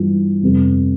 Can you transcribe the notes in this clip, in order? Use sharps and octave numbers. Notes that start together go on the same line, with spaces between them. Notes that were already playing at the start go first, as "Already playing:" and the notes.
Already playing: G2 E3 B3 F4
F2 C3 G3 B3